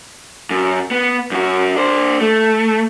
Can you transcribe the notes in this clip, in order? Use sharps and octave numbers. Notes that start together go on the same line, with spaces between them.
F#2
B3
F#2 F#4
D4 C5
A3